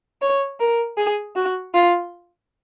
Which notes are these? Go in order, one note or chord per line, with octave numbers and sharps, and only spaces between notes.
C#5
A#4
G#4
F#4
F4